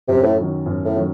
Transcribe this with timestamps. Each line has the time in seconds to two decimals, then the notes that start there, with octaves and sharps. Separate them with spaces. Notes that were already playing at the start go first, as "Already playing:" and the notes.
0.08 F#2 C3
0.23 A2
0.38 D#3 F#3
0.66 F#2
0.85 A2
0.95 D#3 F#3